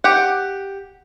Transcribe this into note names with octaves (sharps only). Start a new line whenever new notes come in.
G4 F#5